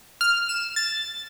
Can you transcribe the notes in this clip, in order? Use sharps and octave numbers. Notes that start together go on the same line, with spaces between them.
F6
E7
A6